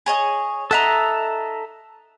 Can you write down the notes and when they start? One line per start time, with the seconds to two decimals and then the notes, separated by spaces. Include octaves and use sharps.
0.06 G#4 C#5 D#5
0.71 D#4 A4 D#5 E5 F#5 A#5